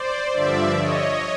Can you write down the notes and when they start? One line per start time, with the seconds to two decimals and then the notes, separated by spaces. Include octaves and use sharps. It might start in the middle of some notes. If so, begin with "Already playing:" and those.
Already playing: C5 D5
0.33 G2 D3 F3 D5 E5
0.78 C#5 D#5